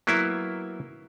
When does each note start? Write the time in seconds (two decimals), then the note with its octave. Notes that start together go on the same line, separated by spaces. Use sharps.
0.07 F#3 A#3 B3 E4